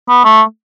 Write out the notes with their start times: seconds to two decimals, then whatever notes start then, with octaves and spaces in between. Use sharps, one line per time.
0.08 B3
0.24 A3